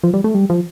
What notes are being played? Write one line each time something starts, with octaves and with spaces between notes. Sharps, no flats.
F3
G3
A3
G3
F3